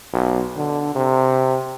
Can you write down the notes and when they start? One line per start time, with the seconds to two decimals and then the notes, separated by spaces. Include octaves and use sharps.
0.13 B1
0.56 D3
0.95 C3